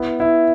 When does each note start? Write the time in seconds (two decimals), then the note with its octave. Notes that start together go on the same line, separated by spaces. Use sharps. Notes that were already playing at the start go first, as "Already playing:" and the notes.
Already playing: B3 E4
0.20 E4